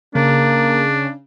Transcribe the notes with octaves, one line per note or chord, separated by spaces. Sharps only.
C#3 A#3 D4